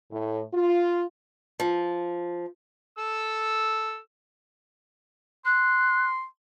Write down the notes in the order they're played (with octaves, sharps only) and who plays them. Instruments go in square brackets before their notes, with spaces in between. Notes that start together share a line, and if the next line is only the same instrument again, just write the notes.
[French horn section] A2
F4
[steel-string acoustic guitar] F3
[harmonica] A4 E6
[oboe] C6 [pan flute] F#6